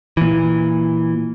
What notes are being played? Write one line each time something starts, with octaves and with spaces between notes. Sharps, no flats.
A#2 E3